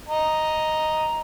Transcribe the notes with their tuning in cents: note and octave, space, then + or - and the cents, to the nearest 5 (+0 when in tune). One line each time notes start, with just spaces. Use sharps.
D#5 +0 A#5 +0